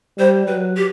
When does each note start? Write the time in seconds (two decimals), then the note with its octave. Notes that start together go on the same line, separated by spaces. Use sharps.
0.18 G3 C5
0.47 F#3 B4
0.77 G4